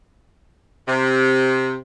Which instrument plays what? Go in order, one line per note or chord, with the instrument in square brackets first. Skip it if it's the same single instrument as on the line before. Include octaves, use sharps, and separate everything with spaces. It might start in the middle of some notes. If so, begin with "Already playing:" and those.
[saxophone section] C3